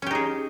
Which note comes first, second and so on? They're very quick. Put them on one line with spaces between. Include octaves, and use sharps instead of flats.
C#4 G4 D#4 G#4